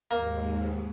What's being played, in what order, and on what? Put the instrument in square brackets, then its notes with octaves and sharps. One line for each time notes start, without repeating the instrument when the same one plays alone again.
[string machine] D#2 G#2 [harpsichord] A#3